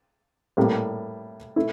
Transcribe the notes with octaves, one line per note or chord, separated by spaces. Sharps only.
A2 G3 A#3
A3 E4